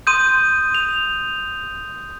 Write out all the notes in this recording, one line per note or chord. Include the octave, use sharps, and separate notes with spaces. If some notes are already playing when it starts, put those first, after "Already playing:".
C6 D#6 G6 D#7
F7